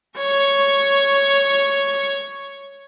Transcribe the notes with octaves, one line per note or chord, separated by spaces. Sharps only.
C#5 C#6